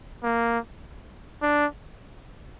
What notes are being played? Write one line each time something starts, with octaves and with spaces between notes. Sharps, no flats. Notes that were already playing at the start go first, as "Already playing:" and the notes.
A#3
D4